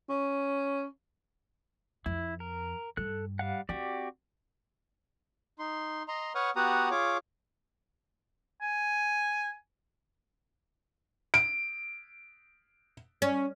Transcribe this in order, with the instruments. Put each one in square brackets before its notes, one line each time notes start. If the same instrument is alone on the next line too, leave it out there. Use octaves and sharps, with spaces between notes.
[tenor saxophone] C#4
[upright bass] F2 [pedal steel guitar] E4
[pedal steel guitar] A#4
[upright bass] G2 [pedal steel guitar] A4 F#6
[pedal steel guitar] G3 F5 F#5
[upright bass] C4 [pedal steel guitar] F#4 G4 D5
[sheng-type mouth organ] D#4 C6
D#5 A#5 C6
B4 C#5 F#5 C#6 D#6 F6
B3 F#4 G4 F#5 A#5 D#6
F4 G#4 C#5 D6
[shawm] G#5
[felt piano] D7
[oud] C#4